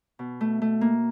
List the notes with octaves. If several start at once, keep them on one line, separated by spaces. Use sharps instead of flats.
B2
A3
A3
A#3